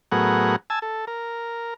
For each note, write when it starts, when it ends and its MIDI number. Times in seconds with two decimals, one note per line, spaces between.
0.12 0.56 45
0.12 0.56 54
0.12 0.56 59
0.12 0.56 68
0.12 0.56 70
0.12 0.56 78
0.70 0.79 80
0.70 0.79 81
0.70 0.79 88
0.82 1.05 69
1.07 1.74 70